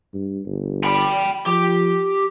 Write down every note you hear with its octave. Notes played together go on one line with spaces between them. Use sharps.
G2
G1
G5 B5
F3 G4